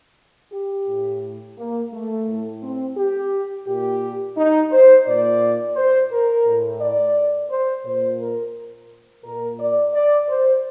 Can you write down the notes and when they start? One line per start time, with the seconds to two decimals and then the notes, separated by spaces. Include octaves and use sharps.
0.53 G4
0.88 A2
1.57 A#3
1.92 A3
2.27 A2
2.61 C4
2.96 G4
3.66 A#2 G4
4.36 D#4
4.71 C5
5.06 A#2 D5
5.76 C5
6.11 A#4
6.45 A2
6.80 D5
7.49 C5
7.85 A#2 C5
8.20 A#4
9.24 A#2 A#4
9.59 D5
9.94 D5
10.29 C5